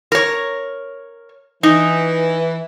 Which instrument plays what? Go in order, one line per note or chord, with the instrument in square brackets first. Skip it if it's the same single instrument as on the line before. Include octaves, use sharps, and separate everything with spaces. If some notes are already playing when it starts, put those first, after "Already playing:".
[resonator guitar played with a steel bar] A#4 C#5
[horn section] E3 [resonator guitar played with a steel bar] D#4